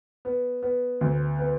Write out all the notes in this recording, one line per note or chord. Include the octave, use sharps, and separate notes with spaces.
B3
B3
D2
B3